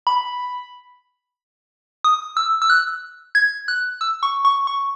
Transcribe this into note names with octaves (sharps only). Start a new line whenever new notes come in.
B5
D#6
E6
E6
F#6
G#6
F#6
E6
C#6
C#6
C#6